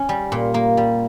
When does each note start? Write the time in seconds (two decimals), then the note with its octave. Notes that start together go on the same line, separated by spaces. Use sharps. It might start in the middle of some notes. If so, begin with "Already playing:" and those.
Already playing: C#4
0.09 G3
0.32 A#2
0.54 A#3
0.77 G3